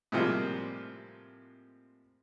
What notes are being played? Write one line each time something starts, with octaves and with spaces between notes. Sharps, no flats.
A2 C3 F3 G3 G#3 A#3